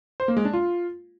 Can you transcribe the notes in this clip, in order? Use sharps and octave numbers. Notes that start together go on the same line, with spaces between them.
C5
A#3
G#3
D4
F4